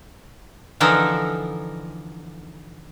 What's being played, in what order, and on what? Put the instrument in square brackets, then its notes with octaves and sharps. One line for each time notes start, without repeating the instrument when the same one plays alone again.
[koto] D3 E3 F3 D#4 A4 A#4